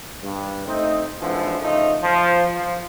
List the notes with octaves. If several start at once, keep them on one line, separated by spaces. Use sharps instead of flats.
G2
A3 C4 D#4
G#1 D3 E3 F3
C#3 F3 A3 D#4
F3
F3